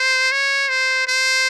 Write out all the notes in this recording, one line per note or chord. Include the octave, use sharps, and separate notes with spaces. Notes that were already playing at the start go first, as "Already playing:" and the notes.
Already playing: C5
C#5
C5
C5